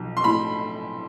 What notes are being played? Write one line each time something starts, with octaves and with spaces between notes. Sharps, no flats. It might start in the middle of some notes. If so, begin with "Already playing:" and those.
Already playing: B1 F3
C6
A2 B5